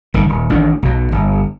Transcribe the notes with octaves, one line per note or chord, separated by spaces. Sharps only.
G1 D#3
D#1
A1 D#3 D4
B1 B2
G1